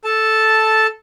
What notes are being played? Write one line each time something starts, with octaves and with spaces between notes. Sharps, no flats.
A4 A5